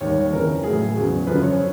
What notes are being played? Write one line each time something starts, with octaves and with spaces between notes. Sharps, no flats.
D#2 D#3 G3 C#5
F2 C#3 E3 A#4
A2 F#3 G#4
E2 C#3 F#3
F#2 D3 F3 B4
C#5